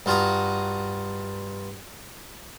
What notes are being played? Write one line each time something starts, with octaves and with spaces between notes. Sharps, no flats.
G2 F4 F#4 A#5 D#6